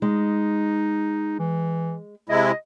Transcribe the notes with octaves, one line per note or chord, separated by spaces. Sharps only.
G#3 D#4
E3
C3 G#3 E4 D#5